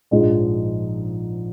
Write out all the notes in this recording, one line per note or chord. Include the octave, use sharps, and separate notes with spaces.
A#1 G#2 F3 G#3 D#4